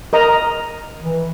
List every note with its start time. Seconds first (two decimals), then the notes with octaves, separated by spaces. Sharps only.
0.13 A#4 D#5 A#5
1.03 E3